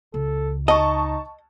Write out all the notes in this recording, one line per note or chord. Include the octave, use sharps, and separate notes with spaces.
C#2 A4
D#4 D#5 A5 C#6